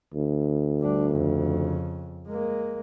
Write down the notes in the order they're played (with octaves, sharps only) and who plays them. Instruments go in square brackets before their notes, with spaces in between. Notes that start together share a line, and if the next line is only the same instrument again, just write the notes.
[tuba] D2
[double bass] G3 D4
F2 C#3
G#3 A#3